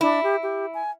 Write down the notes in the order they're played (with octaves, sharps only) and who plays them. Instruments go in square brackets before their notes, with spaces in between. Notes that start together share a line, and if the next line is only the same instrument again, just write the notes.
[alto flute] D4 [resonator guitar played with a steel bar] E4
[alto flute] G4
G4
G#5